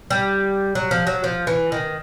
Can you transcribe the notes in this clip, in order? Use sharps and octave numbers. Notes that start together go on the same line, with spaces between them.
G3
F#3
F3
F#3
F3
E3
D#3